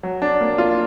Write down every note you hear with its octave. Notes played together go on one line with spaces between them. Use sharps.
F#3
D4
A#3
F4